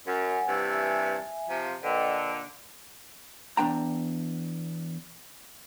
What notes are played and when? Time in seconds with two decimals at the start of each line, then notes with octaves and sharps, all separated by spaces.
0.07 F#2 F#5 G#5
0.48 G2 C3 E3
0.69 E5 G#5
1.49 C3 F3
1.83 A#2 D3 B4 D#5 G5
3.57 E2 A#3 D4 G5 A#5